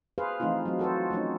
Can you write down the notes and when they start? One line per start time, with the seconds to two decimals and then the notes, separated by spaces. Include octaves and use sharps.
0.18 G#4 B4 C5 F5
0.40 E3 F3 A3 C4 D#4 F4
0.66 F#3 C4
0.79 F#4 A4 B4 C5
1.11 F3 A3 C#4 D#4